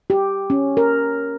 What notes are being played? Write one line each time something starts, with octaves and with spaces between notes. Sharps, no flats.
G4
C#4
A#4